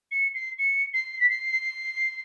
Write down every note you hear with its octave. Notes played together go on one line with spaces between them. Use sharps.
C#7
C7
C#7
C7
B6
C7